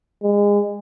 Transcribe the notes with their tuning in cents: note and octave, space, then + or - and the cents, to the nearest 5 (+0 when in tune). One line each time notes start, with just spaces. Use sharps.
G#3 -30